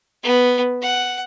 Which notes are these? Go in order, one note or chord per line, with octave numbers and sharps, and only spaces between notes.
B3
F#5